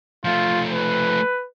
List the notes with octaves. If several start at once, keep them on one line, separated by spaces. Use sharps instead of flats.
F3 A3 F4
B4